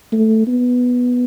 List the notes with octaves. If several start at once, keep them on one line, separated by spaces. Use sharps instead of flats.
A3
B3